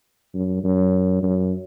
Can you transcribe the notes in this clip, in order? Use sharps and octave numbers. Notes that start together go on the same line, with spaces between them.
F#2
F#2
F#2